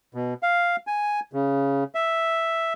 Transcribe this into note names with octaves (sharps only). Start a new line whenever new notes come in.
B2
F5
G#5
C#3
E5